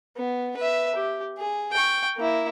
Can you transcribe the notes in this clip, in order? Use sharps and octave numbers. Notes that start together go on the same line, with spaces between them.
B3
B4 E5
G4
G#4
G5 C#6
A#3 E4